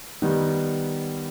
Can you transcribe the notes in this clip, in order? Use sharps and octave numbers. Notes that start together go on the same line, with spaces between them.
D#3 G3 B3 D#4